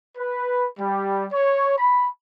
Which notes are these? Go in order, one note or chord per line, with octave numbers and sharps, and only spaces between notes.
B4
G3
C#5
B5